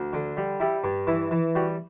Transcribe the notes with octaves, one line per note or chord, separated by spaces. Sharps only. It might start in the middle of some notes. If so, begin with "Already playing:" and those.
Already playing: D2
D3
G3
G3 E4
G2
E3 E4
E3
G3 F#4